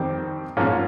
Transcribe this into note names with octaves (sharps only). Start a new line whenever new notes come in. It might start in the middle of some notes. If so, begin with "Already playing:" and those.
Already playing: F2 D#3 G3 C4
G#2 F3 A#3 C#4 F4